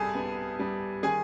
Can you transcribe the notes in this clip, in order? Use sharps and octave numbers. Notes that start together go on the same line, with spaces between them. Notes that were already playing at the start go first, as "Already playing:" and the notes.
Already playing: C2 G3 G#4 A4 G#5 A5
B3
G3
D#3 G#4 G#5